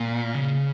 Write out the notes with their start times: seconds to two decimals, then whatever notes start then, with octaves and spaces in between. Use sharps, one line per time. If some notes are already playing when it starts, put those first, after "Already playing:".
Already playing: A#2
0.34 C#3